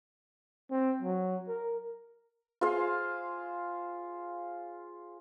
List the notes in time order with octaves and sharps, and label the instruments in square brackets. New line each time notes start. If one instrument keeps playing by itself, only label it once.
[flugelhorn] C4
F#3
A#4
[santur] F4 G#4 C5 F5